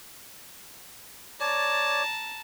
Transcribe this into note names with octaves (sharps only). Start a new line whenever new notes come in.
C#5 D5 A5 A#5